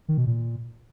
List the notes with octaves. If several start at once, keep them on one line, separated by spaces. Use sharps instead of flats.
D#3
B2
A#2